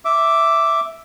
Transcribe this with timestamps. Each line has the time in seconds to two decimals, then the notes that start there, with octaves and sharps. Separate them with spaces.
0.05 E5 D6